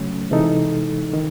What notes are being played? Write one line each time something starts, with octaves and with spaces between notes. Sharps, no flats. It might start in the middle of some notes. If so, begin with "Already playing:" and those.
Already playing: C#3 F#3 A3 C#4
C3 E3 G#3 D#4 A4
D#3